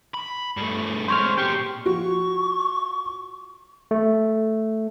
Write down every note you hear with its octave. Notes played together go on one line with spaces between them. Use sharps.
B5
G2 A3
G#3 C4 C5 C#5 F6
A#2 G4 G5 C6 C#6
F3 F#4 C#6
A3